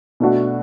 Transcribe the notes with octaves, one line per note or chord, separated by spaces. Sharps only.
B2 A3 D4 F#4